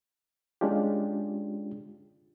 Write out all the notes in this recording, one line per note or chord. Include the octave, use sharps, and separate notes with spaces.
G#3 C#4 D4 F4 G4